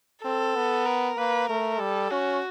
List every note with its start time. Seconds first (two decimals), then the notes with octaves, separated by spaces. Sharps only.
0.24 C4 A4
0.56 B3
0.86 A#4
1.17 A#3 B4
1.49 A3 A#4
1.79 G3 A4
2.11 C#4 F#4